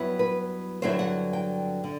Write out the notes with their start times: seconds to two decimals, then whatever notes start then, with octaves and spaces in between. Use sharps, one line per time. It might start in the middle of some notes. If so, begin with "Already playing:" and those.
Already playing: G2 F#3 B3 E4
0.19 B4
0.82 G2 D3 F#3 C4 E4 C5
0.99 F#5
1.33 G5
1.84 D3